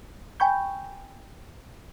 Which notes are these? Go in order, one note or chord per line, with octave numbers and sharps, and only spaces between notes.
G5 G#5 B5 C#6 G6